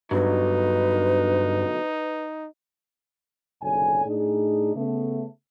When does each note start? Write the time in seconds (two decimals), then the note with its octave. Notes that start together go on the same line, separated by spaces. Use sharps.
0.11 G2 B2 D3 F#3 D#4 B4
3.62 F#1 B1 F2 D3 C#5 G#5
4.05 A2 D4 D#4 G#4
4.75 C#3 A3 B3